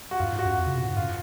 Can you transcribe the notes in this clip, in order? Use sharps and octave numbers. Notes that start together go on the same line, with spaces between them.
F#4
F#2 F4
G#2
F#4
F#2
F2
C#3
B2
A2
G#2
F#2 F4